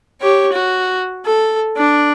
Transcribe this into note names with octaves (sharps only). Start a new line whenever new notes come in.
G4 C#5
F#4
A4
D4